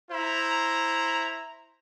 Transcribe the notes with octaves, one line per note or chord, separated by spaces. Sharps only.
E4 C5 A#5